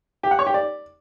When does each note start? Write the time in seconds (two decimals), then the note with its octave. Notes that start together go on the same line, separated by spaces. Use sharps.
0.23 G4
0.31 F#5
0.39 C#5
0.46 G4
0.54 D5